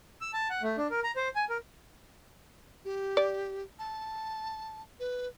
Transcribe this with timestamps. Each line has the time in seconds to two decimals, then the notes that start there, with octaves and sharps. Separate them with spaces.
0.21 E6
0.33 A5
0.50 F#5
0.63 A3
0.78 D4
0.90 A#4
1.04 A#5
1.16 C5
1.36 G#5
1.50 A#4
2.85 G4
3.17 D5
3.79 A5
5.00 B4